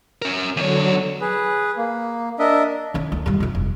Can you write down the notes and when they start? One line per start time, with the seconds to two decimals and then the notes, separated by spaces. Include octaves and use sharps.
0.22 C#4 A#4
0.57 E2 D3 F#3 C#5
1.21 G#4 B4
1.77 A#3
2.39 D4 A#4 D#5 E5
2.94 D#3 C#4
3.12 D2
3.26 D#2 G3
3.40 F2 E4
3.55 F1